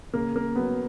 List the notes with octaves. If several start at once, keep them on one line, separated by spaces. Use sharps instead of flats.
C#3 A#3
A#3
F#3 B3